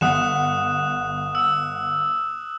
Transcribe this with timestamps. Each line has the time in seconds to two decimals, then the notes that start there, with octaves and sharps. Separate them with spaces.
0.01 G1 F#5 D#6 F#6 E7
1.35 E6